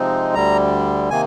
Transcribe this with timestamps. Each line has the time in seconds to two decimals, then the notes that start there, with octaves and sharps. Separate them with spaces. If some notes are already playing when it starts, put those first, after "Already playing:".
Already playing: C3 F3 G#3 C4 D#4
0.35 D2 D3 G3 A#5
1.10 C3 D#3 A#3 G#5